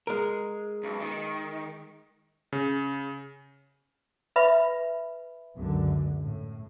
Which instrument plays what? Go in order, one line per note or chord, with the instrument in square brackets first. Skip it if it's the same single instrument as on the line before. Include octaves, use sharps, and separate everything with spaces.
[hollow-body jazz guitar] G#3 A#4
[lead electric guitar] B1
D#3
[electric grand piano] C#3
[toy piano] B4 E5 B5
[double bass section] C#2 F#2 D3
A2